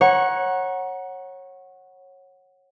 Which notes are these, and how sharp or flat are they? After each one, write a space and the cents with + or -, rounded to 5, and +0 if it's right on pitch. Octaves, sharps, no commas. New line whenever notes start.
C#5 -20 F#5 +0 A#5 +25